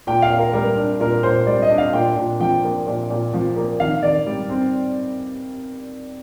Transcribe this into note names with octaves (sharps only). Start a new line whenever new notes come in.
A#2 G5
F5
A#2
A#4
G3 A#4
D4
A#2 A#4
A#2 C5
G3 D5
D#5
D4
F5
A#2 G5
A#2
F3 G5
A#3
A#2
A#2
F3
A#3
D#3 F5
D#3 D5
G3
C4